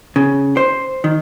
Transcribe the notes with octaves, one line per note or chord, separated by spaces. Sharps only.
C#3
C5
D#3